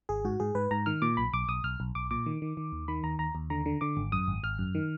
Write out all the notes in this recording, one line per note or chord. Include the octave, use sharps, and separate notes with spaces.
G#1 G#4
G#2 F#4
G#2 G#4
G#2 B4
G#2 A#5
D#3 F6
A#2 D6
B1 B5
B1 D6
B1 D#6
B1 F6
B1
B1 D6
A#2 D6
D#3
D#3
D#3
D#2
D#3 B5
D#2 A#5
D#2 A#5
D#2
D3 A#5
D3
D3 D6
G#1
F#2 D#6
G#1
G#1 F6
F#2
D#3